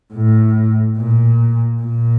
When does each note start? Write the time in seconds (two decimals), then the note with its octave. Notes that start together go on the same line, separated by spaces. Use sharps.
0.13 A2
0.98 A#2
1.82 A#2